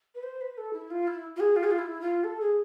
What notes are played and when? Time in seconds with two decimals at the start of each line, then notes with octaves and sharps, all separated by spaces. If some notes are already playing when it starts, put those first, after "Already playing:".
0.15 B4
0.23 C5
0.41 B4
0.57 A4
0.73 E4
0.91 F4
1.07 E4
1.36 F4
1.40 G#4
1.56 F4
1.63 G#4
1.71 F4
1.78 E4
2.01 F4
2.24 A4
2.40 G#4